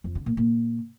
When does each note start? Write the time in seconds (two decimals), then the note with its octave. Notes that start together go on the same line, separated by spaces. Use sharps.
0.04 F2
0.15 D3
0.26 A#2
0.37 A#2